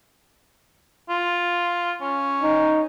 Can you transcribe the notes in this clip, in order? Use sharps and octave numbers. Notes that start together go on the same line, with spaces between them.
F4
C#4
D#4